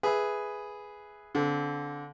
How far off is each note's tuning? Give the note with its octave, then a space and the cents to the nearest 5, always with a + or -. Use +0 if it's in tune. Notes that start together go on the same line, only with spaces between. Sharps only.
G#4 +0 B4 +0 E5 +0
D3 -25 C4 -25